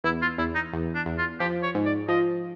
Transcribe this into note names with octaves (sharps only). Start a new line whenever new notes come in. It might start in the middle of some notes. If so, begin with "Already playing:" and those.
E2 E4
F4
E2 E4
D#4
E2
D4
E2
F4
F3 G4
C#5
G#2
D5
F3 D#5